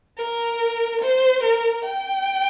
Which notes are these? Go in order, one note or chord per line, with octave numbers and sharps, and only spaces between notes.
A#4
C5
A#4
G5